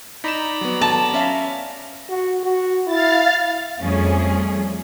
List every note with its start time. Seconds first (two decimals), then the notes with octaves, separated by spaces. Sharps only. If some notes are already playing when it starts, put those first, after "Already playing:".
0.24 D#4 D5 A#5 B5 E7
0.61 F#3 B3
0.81 A5
1.13 C#4 E5 F5
2.09 F#4
2.43 F#4
2.87 E4 F5 A6
3.80 F2 F3 G3 A3 C#4 G#4